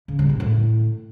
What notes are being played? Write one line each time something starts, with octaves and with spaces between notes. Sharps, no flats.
C#3
G3
A2
A2